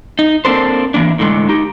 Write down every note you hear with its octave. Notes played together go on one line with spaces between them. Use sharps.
D#4
A#3 C4 D4 A4 C5
E3 A#3 D4
A2 D3 G#3
D#4 G4